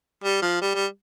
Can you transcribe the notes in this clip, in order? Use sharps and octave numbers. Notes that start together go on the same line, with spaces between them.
G3
F3
G3
G3